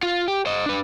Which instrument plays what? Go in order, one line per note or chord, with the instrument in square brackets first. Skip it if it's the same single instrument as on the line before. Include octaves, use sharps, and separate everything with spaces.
[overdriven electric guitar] F4
G4
C5 D#5
D4 B4